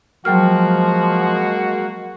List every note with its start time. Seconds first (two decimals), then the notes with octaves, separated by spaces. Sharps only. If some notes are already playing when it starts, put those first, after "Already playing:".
0.25 F3 F#3 G#3 A#3 F#4 G5 F6